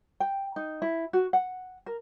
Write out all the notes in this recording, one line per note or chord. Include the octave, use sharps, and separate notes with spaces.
G5
D#4
E4
F#4
F#5
A#4